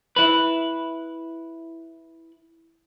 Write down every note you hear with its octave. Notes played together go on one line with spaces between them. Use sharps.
E4 B4